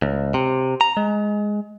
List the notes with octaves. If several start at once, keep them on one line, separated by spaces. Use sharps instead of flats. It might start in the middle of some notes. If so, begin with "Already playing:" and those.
C#2
C3
A#5
G#3